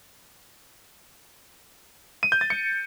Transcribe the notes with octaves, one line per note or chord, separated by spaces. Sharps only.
D#7
G6
A6
C#7